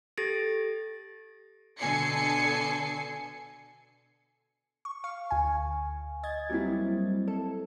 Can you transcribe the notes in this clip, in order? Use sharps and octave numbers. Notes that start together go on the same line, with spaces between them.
G4 A4 A6 A#6 D7
B2 D3 A4 G#5 C7 C#7
C#6
F5 C#6
D2 G#5
D#5 G#6 A6
F#3 G3 A#3 C4 E4
A4